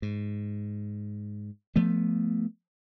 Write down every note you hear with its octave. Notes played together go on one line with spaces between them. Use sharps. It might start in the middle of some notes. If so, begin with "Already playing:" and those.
G#2
F3 A3 B3